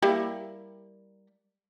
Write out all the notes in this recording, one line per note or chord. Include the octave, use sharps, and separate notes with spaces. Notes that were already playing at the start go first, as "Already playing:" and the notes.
G3 A#3 E4